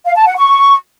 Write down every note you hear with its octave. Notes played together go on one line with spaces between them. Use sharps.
F5
A5
F#5
C#6